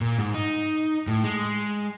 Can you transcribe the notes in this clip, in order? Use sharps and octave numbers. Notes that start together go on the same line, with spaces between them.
A#2
G#2
D#4
A2
G#3